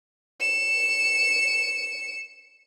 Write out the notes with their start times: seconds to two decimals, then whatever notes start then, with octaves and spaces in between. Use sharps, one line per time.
0.40 C#7 E7